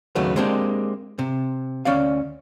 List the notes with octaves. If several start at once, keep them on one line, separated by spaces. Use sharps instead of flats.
D#2 C#3 F#3 A3 B3
G#3 A#3 C4 D4 G4
C3
D2 C#4 D5 F5